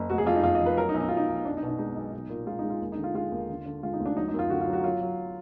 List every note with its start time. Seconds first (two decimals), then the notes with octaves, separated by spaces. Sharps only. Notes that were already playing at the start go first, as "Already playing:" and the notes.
Already playing: F#1
0.10 F1 F#4
0.18 G#4
0.26 F2 F4
0.35 D#4
0.43 F2 F4
0.55 D#5
0.61 F3
0.66 B4
0.77 F#3 A#4
0.89 D#4
0.94 B1
1.00 D#4
1.09 B1 F4
1.17 D#4
1.29 B1
1.45 B1 D4
1.57 D#4
1.63 B2
1.68 D#4
1.79 G#3 D#4
1.96 B1
2.13 B1
2.29 A#2
2.46 G#3 F4
2.59 D#4
2.63 G#3
2.70 F4
2.81 D#2
2.92 D#4
2.97 D3
3.04 F4
3.14 G#3 F4
3.32 D#2
3.49 D3
3.66 D3
3.83 G#3 F4
3.93 D#4
4.00 D2
4.06 D4
4.16 F#3 D#4
4.28 D#4
4.34 F#2
4.39 F4
4.50 D3 F#4
4.61 F4
4.68 F#3
4.73 F#4
4.84 F#3 F4
5.01 F#3